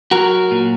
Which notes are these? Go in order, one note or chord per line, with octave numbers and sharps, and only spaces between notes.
F#3 F#4 A#4
A#2